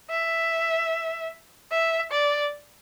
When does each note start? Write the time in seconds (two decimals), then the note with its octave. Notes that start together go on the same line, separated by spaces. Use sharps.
0.10 E5
1.72 E5
2.12 D5